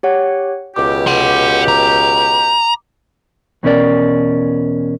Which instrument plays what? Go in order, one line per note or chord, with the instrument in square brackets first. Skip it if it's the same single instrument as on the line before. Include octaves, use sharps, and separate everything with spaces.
[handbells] G4 C#5 F#5
[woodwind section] C#2 B2 G4 [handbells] D6
[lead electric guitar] F#5 C6
A#5
[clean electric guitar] E2 B2 C#4 A#4 D5